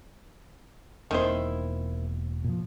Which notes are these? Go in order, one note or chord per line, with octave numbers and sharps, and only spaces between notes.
E1 D#3 A#3 C4 E4 C5
A#2 F3